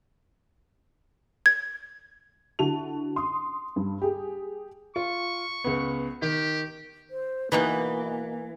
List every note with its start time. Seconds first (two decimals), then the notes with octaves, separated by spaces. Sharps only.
1.46 G#6
2.59 D3 E4 F#4 A5 F7
3.16 C6 D#6
3.76 G2
4.02 G4 G#4
4.96 F4 C#6
5.64 C#2 B3
6.22 D#3 G4
7.10 C5
7.52 B2 E3 A#3 D#4 B4